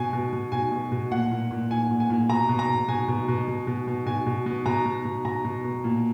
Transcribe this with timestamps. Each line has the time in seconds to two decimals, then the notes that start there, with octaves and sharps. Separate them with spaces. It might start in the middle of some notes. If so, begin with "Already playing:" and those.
Already playing: B2 G#5
0.13 B2
0.33 B2
0.52 B2 G#5
0.72 B2
0.92 B2
1.11 A#2 F#5
1.31 A#2
1.51 A#2
1.71 A#2 G#5
1.91 A#2
2.00 G#5
2.10 A#2
2.29 B2 A#5
2.49 B2
2.59 A#5
2.69 B2
2.88 B2 G#5
3.08 B2
3.28 B2
3.48 B2
3.67 B2
3.87 B2
4.06 B2 G#5
4.26 B2
4.46 B2
4.66 B2 A#5
4.86 B2
5.05 B2
5.25 B2 A#5
5.45 B2
5.64 B2
5.84 A#2